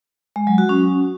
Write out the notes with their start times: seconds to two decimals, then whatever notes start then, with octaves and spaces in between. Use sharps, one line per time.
0.36 G#3
0.47 F#3
0.58 F#4
0.69 C#4